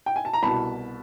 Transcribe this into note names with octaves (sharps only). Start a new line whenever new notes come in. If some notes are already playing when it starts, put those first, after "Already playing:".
G5
G#5
A5
A#5
C2 B2 A5 B5